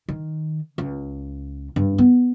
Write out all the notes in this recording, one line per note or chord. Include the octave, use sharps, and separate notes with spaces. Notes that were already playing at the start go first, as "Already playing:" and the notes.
D#3
C#2
G2
B3